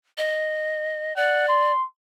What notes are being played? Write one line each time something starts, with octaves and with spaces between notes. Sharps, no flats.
D#5
D5 F#5
C6